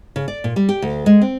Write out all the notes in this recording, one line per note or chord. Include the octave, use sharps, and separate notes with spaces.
C#3
D5
A#2
G3
G4
D2
G#3
C4